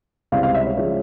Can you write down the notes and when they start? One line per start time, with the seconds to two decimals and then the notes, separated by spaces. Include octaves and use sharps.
0.32 C#2 C3 G3 C4 E4 F5
0.43 F5
0.54 E5
0.66 C#5
0.77 C#3 F3 G#3 C#4 C#5